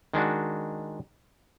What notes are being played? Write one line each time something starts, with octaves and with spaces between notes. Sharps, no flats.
D#3 G#3 D4 F#4